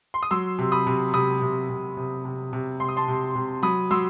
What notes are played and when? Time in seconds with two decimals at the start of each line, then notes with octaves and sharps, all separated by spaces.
0.14 C6
0.23 D#6
0.31 F#3 C6 E6
0.59 C3
0.72 B5 D#6
0.87 C3
1.13 C3 B5 D#6
1.42 C3
1.70 C3
1.97 C3
2.25 C3
2.53 C3
2.80 C3 C6
2.89 D#6
2.97 A5 C6
3.08 C3
3.35 C3
3.63 F#3 B5 D#6
3.91 F#3 C6 E6